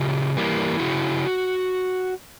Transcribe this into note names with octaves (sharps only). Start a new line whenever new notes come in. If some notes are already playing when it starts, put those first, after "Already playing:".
Already playing: C#3 F4 G4
E3 G3 A#3
C#3 E4 F#4